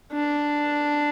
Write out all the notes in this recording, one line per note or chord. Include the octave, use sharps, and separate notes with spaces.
D4